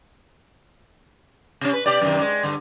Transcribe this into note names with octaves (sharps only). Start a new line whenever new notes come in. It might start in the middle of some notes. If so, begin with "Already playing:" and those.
C3 C#4
B4
C3 G4 D5
F#2 C3 D#3
G#3
G2 D3